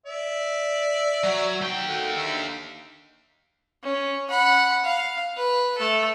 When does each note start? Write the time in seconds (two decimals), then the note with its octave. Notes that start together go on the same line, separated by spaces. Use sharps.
0.06 D5 E5
1.24 F#3
1.61 D#2 G5
1.87 A3 F#4
2.17 D3 E5
3.83 C#4
4.30 F#5 B5
4.84 F5
5.37 B4
5.78 A3 A4